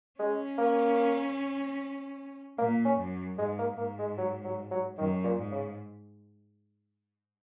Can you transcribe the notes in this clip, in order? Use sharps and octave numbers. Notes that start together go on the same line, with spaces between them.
G#3 C#4
A#3
A#2 A#3
C#4
F#2
G#2 G#3
A#3
G#2 A#3
G#3
F#3
F#3
F#3
F#2 D#3
A#2
G#2
C#3